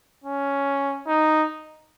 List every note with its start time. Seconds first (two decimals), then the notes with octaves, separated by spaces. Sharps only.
0.24 C#4
1.08 D#4